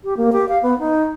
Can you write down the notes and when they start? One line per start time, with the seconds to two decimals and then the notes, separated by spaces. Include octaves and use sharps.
0.04 G4
0.17 A#3
0.32 G4
0.49 F5
0.62 B3
0.79 D#4